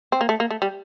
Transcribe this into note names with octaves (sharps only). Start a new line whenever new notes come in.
C4
A#3
A3
A#3
A3
G3